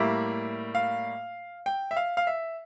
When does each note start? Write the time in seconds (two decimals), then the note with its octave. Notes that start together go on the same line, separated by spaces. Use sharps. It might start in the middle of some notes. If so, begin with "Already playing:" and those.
Already playing: A2 G3 A#3 E5
0.75 F5
1.66 G5
1.91 E5
1.96 F5
2.17 F5
2.27 E5